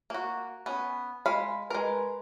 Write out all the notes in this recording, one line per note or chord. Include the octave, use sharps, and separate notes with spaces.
A#3 F#4
B3 C#4
G#3 F5 B5
G#3 A#4 B4